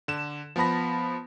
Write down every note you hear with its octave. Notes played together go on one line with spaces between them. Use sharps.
D3 E7
F3 B3 A5 B5 A#6